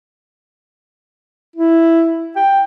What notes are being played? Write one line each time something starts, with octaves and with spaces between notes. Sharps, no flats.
E4
G5